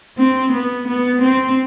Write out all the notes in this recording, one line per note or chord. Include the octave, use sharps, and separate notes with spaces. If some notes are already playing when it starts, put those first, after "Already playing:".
C4
B3
B3
C4